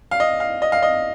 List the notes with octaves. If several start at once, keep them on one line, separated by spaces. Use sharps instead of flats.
F5
D#5
F5
D#5
F5
D#5